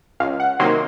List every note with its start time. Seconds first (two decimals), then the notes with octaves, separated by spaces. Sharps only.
0.20 C#2 F5
0.40 F#5
0.59 C3 D#3 F#3 A#3 C6